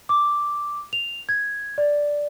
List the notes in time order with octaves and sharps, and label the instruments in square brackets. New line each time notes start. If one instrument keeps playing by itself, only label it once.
[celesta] D6
F7
G#6
D5